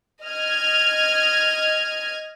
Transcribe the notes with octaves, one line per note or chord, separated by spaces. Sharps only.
D#5 F6 G#6